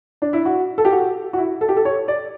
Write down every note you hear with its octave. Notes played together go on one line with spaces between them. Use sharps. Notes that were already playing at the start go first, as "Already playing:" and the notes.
D4
E4
F#4
A4
G4
F#4
F#4
E4
A4
G4
A4
C#5
D5